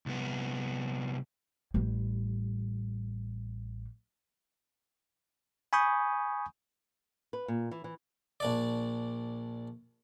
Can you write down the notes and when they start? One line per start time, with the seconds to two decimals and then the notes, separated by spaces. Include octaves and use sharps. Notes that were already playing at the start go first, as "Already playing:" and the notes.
0.06 C2 B3
1.74 A1 G3
5.73 G#5 B5 C#6 D#6 G6
7.33 B4
7.48 A#2
7.71 E3
7.84 E3
8.40 A#1 D4 D5